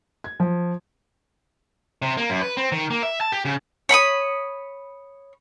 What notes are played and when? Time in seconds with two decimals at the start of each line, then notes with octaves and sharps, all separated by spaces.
0.24 G#6
0.40 F3
2.02 C3
2.17 A#3
2.30 F#2
2.42 B4
2.57 C4
2.72 D#3
2.90 A#3
3.03 E5
3.21 A5
3.32 G4
3.45 C#3
3.89 C#5 B5 C#6 D#6